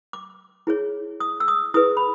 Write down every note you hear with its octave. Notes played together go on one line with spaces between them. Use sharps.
D6
E4 G#4 C#5
D#6
E6
D#6
E4 G#4 B4 D#6
B5